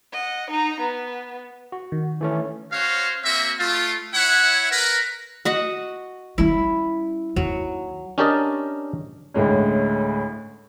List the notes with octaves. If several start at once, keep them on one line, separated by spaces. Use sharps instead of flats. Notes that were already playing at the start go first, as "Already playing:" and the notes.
D#5 F#5
D#4 A#5
B3
F#4
D#3
E3 A3 C#4
C#4 F#4 C5 C#5 F5
A#3 C4 F#4 E5
A3 F4
E4 C#5 E5 F#5
A#4 B4
F#4 D#5 F#5
G3 C#4 E4
D#2 F#3
C#4 D4 G4 A#4 D5 D#5
D2 A2 G#3 C#4